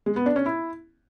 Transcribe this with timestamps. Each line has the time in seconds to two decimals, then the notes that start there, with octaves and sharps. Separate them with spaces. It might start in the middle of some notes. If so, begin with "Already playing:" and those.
0.06 G#3
0.16 B3
0.26 D4
0.36 C#4
0.46 E4